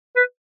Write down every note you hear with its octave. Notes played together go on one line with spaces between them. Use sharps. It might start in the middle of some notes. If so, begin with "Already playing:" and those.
B4